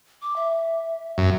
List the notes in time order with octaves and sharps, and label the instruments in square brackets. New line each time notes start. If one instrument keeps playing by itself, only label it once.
[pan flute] D6
E5
[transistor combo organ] F#2